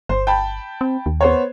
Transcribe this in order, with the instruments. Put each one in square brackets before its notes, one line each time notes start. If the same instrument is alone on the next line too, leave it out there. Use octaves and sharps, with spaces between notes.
[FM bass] G1 [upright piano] C5
[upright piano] G5 A5 B5
[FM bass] C4
D#2
[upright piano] B3 C5 C#5